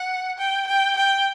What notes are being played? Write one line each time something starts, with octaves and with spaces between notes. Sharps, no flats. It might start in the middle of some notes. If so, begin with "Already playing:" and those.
Already playing: F#5
G5
G5
G5